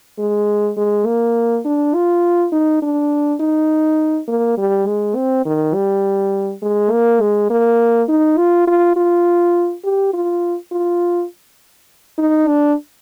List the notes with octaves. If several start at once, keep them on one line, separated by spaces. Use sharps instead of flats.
G#3
G#3
A#3
D4
F4
D#4
D4
D#4
A#3
G3
G#3
C4
D#3
G3
G#3
A#3
G#3
A#3
D#4
F4
F4
F4
G4
F4
F4
D#4
D4